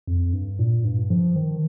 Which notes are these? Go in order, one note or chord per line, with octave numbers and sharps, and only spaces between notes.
F2
G2
A#2
G2
F3
D#3